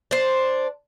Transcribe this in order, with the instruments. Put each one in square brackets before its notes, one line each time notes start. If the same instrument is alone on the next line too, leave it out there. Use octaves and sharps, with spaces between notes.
[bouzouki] D4 C5